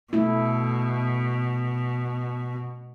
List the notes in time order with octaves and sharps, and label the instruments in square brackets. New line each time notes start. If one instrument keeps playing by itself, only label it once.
[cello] B2 [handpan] A3 E4